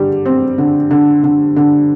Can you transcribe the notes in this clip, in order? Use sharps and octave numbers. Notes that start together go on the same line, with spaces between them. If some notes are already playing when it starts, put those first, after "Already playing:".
Already playing: D3 G3
C4
D3
D3
D3
D3